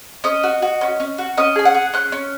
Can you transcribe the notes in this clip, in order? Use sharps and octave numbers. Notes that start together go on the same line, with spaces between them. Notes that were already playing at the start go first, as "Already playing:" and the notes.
C#4 D#5
F#4
F#4
C#4
C#4
F#4
C#4 D#5
G#4 G#5
F#5
G#4
C#4 F#6
C#4